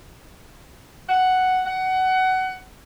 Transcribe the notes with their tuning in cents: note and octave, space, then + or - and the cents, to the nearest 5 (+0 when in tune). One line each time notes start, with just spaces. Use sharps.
F#5 +5
F#5 +20